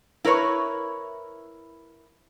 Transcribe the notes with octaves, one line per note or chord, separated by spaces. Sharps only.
E4 A#4 B4 C#5